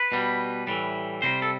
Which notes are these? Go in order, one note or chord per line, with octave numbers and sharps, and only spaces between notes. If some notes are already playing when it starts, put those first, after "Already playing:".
Already playing: B4
B2 G3
A2 E3 G3
C3 G3 C5
A4